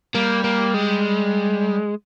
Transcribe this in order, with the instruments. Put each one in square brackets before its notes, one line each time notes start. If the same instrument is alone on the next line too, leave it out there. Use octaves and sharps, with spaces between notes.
[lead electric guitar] G3 [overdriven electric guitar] A#3
[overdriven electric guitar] A#3
G#3